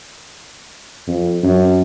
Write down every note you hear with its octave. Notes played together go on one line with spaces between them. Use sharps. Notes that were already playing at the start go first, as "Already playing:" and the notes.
F2
F#2